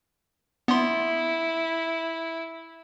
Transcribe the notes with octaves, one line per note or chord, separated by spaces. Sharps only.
B3 E4 C6